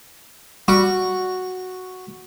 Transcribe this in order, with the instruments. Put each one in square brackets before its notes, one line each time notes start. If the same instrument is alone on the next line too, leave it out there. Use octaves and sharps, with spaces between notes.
[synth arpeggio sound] G3 [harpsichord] F#4